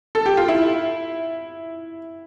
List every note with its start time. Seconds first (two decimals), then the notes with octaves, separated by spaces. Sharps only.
0.15 A4
0.26 G4
0.37 F4
0.48 E4